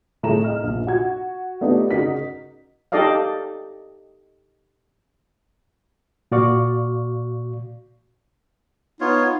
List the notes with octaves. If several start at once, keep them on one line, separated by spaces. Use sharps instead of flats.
A2 G#3 A3 A#5 E7
D#5 F6
A#1
F#4 G#6
A3 B3 D4 D#4 G4
C#3 D#4 F#4 A#4 B6
D#4 G4 A4 D5 D#5 F5
A#2 F#4 D5 F5 C#6
B3 D#4 F4 C#5